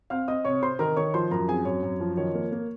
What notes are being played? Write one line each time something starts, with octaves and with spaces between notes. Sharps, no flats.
C4 F5 F6
C4 D#5 D#6
C3 C#5 C#6
C3 C5 C6
D#3 A#4 A#5
D#3 C#5 C#6
F3 C5 C6
F#2 A#4 A#5
C4 G#4 G#5
F#2 C#5
F#2
F3
D#3 C#5
A#3
A#3